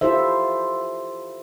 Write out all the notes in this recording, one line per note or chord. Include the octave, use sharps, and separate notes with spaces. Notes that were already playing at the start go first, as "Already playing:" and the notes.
E4 F4 G4 A4 C5 E5